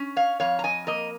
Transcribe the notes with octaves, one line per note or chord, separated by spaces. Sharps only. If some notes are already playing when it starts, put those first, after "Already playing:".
Already playing: C#4
C#5 F5
F2 C#5 F5
A#5
D#5 G#5
A#3 A#4 D#5